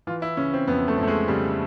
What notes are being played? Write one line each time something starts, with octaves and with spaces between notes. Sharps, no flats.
E3 F4
E4
C#3 C#4
C4
F2 B3
A3
F2
A3
G#3
C#3 G3